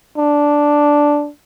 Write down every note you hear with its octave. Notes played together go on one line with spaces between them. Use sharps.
D4